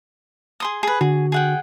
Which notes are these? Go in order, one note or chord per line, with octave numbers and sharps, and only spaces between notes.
G#4 C6 D#6
G#4 B4
D3 F#4 G#4
G#4 F#5 G5